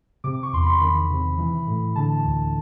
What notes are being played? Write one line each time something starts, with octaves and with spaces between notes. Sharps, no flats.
C3 D6
C#6
E2 C6
B5
D#3 B5
C3
E3
A2
D3 A5
D2